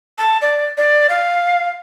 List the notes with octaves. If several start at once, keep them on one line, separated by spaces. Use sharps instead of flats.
A5
D5
D5
F5